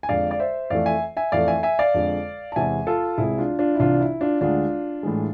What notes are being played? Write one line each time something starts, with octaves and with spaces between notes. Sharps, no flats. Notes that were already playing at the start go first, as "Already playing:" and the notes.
G#5
F2 D3 G#3 D5 F5
D5
C5 E5
F2 E3 A3 D5 F5
E5 G#5
E5 G#5
F2 E3 A3 D5 F5
E5 G#5
E5 G#5
D5 F5
F2 D3 G#3
A5
E2 C3 E3 G#3 E5 G#5
F4 A4
C2 C3 G#3 E4 G#4
D4 F4
D4 F4
E4
C2 C3 E3 D4 F4
E4
D4 F4
D2 D3 G#3 D4 F4
A2 E3 G#3